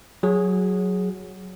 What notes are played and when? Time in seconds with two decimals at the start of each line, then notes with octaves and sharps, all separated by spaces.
0.23 F#3 G#4